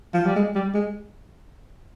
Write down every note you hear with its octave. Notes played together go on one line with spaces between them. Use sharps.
F3
G3
G#3
G3
G#3